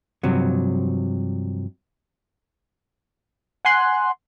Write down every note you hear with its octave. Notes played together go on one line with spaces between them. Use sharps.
G2 C3 F3 F#3
F#5 G#5 C6 F#6